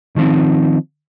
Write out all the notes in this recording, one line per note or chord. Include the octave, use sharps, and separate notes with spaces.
D#3 F3 G3 C4 D#4